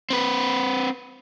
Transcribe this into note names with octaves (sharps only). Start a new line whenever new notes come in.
C4 B4